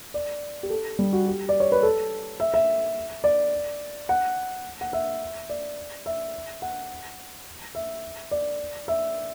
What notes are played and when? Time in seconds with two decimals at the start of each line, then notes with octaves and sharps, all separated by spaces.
0.14 D5
0.63 G4
0.70 A4
0.99 G3
1.13 F#4
1.27 G4
1.49 D5
1.60 C#5
1.72 B4
1.83 A4
2.40 E5
2.54 E5
3.24 D5
4.09 F#5
4.81 F#5
4.93 E5
5.49 D5
6.06 E5
6.62 F#5
7.75 E5
8.31 D5
8.88 E5